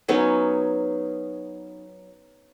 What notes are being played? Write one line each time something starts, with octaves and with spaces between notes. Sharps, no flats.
F#3 B3 C#4 D#4